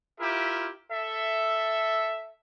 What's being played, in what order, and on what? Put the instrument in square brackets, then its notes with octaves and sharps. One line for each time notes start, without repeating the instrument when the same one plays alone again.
[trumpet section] E4 F4 G4 A#4 E5
A4 E5